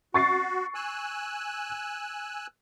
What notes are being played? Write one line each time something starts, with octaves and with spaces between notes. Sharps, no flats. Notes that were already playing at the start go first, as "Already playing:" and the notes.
F#4 C#6 A6 C7
G#5 E6 F#6